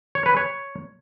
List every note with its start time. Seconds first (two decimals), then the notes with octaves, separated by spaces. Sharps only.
0.15 C#5
0.26 B4
0.37 C#5